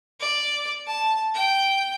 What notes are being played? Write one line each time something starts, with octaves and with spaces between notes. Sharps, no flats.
D5
A5
G5